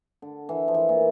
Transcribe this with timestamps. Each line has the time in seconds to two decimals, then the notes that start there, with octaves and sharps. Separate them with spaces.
0.22 D3
0.49 E3
0.68 F3
0.74 E3
0.89 A#2